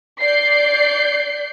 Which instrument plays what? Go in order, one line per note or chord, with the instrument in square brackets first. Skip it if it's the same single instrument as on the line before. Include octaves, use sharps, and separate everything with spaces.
[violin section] D5 G6 C7